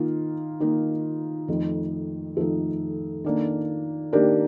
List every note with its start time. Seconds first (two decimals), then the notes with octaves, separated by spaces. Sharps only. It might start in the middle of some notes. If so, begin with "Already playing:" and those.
Already playing: D#3 A#3 D#4 F4
0.60 D#3 A#3 D#4
1.48 F2 D#3 A3 D#4
2.37 F2 D#3 A3 D#4 F4 A4
3.24 D#3 A#3 D4
4.13 D#3 A#3 D4 G4 A#4